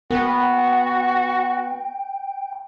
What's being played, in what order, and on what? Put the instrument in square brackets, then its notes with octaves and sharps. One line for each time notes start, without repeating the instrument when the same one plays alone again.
[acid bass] B3 [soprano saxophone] F#4 [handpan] A#4 [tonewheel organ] G5